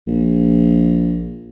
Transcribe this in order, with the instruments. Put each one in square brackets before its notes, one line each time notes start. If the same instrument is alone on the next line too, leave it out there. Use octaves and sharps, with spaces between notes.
[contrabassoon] A#1